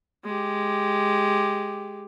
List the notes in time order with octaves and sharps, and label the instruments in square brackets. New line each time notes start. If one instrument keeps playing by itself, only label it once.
[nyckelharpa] G#3 G4